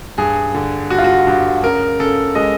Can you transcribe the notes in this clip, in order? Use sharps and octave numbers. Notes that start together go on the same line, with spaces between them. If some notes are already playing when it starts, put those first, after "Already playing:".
G2 G#4
D3
G3 F#4
F4
F#4
G2
C#3 A#4
C#3 A4
G#3 D#5